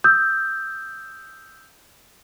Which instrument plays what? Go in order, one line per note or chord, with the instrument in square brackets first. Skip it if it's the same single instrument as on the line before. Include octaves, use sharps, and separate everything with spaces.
[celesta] D#6 E6 G6